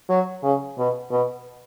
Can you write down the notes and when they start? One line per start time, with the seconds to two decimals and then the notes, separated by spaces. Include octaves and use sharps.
0.10 F#3
0.44 C#3
0.78 B2
1.11 B2